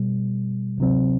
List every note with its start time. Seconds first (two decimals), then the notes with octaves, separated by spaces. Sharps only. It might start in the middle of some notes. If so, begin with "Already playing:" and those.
Already playing: B2 G3
0.78 D2 C3 F#3 C4